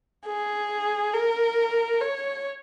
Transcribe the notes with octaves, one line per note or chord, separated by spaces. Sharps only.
G#4
A#4
C#5